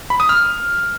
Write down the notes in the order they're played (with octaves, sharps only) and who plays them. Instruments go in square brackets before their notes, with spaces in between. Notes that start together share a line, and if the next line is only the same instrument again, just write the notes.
[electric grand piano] B5
D#6
F6